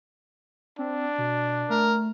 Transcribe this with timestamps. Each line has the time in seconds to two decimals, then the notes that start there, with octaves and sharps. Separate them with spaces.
0.79 C4 D4
1.18 B2
1.70 A3 A#4